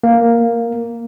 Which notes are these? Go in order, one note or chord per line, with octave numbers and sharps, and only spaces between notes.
A#3